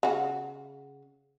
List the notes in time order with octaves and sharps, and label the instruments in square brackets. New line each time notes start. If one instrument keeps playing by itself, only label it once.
[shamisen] C#3 F#4